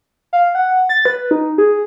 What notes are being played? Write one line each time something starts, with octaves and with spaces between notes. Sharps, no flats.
F5
F#5
A6
B4
D#4
G#4